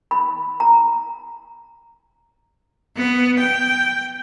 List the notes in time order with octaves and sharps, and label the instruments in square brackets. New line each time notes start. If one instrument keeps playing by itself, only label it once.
[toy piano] B5
A#5
[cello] B3
G5